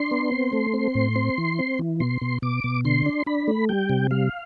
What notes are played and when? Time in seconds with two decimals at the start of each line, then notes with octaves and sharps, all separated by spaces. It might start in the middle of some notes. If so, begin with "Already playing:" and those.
Already playing: D4 C6
0.11 B3
0.32 C4
0.53 A3
0.74 C4
0.95 A2
1.16 C4
1.38 E3
1.59 C4
1.79 E3
2.00 B2 C6
2.21 B2
2.42 B2 D6
2.64 B2
2.85 D3 C6
3.06 D4
3.26 D4 B5
3.48 A3
3.69 G3 G5
3.89 C3
4.11 G3 F5